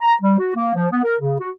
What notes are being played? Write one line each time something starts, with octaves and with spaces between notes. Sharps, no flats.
A#5
G3
F#4
A#3
F3
B3
A#4
C#3
F#4